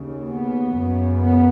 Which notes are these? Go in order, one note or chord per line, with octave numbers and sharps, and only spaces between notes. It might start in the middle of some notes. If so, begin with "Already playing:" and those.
Already playing: D#2 C#3
B3
F#2 C#3
B3